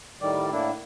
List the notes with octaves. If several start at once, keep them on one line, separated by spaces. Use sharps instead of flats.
A2 D#3 G3 D5
A2 A#3 D4 E4